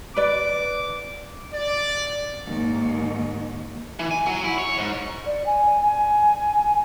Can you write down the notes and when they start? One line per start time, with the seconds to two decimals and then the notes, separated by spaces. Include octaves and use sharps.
0.16 B4 D5 D6
1.54 D5
2.46 D#2 G#2
3.99 E3
4.11 G#5
4.26 F#3
4.44 E4
4.58 C#5
4.78 G#2
5.26 D5
5.46 G#5
5.83 G#5